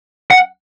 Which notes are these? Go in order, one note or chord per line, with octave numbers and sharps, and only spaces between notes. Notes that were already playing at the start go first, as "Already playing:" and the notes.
F#5